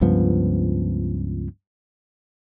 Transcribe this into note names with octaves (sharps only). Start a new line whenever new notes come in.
C#2 G2 F3 B3